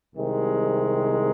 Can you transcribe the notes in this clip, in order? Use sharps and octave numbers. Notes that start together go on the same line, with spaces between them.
C2 C3 D#3 G#3